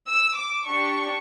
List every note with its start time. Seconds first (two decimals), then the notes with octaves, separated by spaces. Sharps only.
0.08 E6
0.38 D6
0.68 D4 G4 C#6